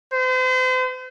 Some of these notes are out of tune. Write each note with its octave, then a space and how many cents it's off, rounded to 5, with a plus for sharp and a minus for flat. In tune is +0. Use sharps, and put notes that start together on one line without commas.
C5 -40